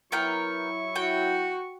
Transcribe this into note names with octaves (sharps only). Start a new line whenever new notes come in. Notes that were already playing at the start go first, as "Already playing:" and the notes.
F#3 B3 E4 A#4 G5 C#6
F#4 G5